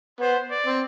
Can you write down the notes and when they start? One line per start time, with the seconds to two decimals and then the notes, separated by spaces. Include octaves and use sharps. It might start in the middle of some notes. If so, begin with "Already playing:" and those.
0.21 B3 C5
0.50 D5
0.66 C4